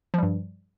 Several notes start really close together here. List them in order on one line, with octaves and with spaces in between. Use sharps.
F3 G3 G2